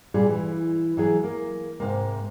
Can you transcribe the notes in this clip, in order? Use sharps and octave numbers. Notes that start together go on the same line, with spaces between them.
A#2 G3 G#4
E3
E3 F#3 G#4
A#3
G#2 C3 A#3